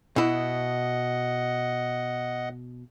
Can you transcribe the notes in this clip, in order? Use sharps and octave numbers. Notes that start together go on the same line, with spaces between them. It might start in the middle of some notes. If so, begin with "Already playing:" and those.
B2 E4 D#5 F#5